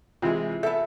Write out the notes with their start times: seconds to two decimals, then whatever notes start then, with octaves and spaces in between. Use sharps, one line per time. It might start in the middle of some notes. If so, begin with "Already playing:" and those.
0.22 C3 E3 G#3 F4
0.63 B3 A4 D5 E5